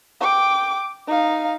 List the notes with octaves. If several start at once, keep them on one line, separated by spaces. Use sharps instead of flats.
G5 D6
D#4 F5